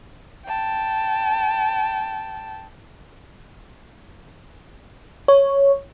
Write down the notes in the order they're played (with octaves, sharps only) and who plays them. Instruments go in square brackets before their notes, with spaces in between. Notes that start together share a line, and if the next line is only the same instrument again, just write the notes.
[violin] G5 A5
[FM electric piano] C#5